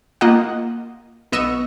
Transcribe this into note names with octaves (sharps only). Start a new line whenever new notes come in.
A#3 F4 D#5 F#5
B1 B3 D#5 C#6 E6 D#7